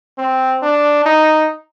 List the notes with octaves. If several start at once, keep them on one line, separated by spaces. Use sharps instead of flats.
C4
D4
D#4